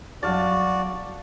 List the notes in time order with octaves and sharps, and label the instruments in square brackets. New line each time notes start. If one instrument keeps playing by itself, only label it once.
[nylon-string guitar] F#2 F#3 G3 [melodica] F#4 D5 [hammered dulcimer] F5 A5